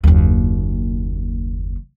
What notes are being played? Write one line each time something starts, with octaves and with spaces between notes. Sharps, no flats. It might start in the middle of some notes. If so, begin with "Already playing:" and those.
F#1 D#2